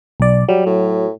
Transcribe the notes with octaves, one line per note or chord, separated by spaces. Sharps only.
B1 D5
F#3 G3
A2